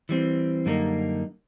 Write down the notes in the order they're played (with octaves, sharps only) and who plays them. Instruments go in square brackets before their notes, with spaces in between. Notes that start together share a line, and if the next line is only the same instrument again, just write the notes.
[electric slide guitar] E3 G3 C4
F#2 D3 G3 A#3 D#4